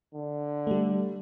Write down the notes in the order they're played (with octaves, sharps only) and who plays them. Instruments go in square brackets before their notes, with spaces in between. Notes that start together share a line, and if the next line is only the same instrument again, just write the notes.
[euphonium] D3
[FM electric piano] G3 A3